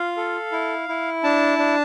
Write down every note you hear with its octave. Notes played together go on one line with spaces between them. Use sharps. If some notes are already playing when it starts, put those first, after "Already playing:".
Already playing: F4 F5
A4
E4
E4
D4 A5
D4